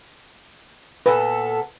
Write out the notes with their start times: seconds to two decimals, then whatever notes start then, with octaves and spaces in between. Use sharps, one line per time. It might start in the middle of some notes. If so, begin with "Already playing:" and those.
1.06 A#2 B3 A4 B4